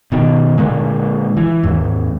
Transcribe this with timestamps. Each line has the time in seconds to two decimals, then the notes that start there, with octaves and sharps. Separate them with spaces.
0.12 B2 D#3
0.58 A#2 D3 G#3
1.37 E3
1.63 D#2 G#2